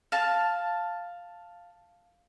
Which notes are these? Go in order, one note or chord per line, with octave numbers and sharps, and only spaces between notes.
F5 A5